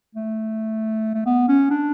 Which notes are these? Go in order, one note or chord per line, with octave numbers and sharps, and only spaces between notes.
A3
A3
B3
C#4
D4